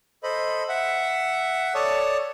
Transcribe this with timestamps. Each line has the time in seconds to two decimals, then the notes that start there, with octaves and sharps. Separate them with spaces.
0.23 A4 C5 D#5 B5
0.69 E5 F#5
1.75 A4 C#5 D5 A5 D#6